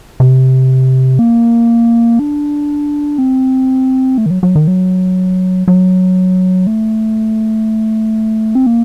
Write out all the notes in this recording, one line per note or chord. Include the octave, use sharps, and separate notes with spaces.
C3
A#3
D4
C4
A3
D#3
F#3
F#3
D#3
F#3
F#3
A3
C4
A#3